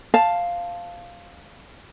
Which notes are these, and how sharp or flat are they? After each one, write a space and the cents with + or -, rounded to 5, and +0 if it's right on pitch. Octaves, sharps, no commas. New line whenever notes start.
C5 +0 F5 +0 A5 +0